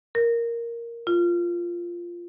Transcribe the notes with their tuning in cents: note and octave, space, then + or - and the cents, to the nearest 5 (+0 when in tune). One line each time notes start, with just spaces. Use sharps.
A#4 +0
F4 -5